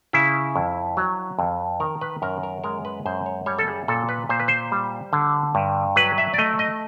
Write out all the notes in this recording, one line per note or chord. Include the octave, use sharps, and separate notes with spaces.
C#3 E4
F2
F#3
F2
D#3 A#4
B4
F#2 A#4
A#4
G#3 A#4
B4
F#2 C5
C#5
G3 C#5
A4
G#4
A#2 A4
B4
A#2 C5
B4
C5
G3
D3
G2
F#3 B4
E5
D5
A3 D#5
D#5